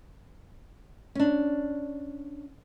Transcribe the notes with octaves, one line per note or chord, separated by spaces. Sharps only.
C#4 D4